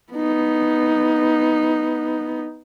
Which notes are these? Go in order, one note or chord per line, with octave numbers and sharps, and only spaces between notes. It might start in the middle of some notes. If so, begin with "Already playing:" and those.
B3 D#4